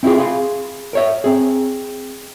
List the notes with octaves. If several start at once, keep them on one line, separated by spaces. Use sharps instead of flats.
C4 E4 F4 G4 G#4
G#4 F5 B5 C6
A#4 C#5 E5
C4 G#4